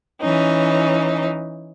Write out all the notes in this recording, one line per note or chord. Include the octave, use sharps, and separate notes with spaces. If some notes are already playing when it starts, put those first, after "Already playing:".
E3 C#4 D#4